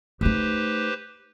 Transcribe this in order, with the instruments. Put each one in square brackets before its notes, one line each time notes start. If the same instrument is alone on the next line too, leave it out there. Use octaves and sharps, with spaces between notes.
[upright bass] A3 D#4 [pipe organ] G4 B4 C5